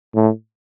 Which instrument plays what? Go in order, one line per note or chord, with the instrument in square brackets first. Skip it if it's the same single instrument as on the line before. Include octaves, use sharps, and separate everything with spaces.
[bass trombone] A2